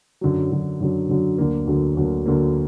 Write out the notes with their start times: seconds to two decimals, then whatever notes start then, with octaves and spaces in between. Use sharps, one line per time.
0.21 F#2 D3 F#3
0.52 F#2 D3 F#3
0.80 F#2 D3 F#3
1.09 F#2 D3 F#3
1.38 D2 D3 F#3 A#3
1.67 D2 D3 F#3 A#3
1.97 D2 D3 F#3 A#3
2.26 D2 D3 F#3 A#3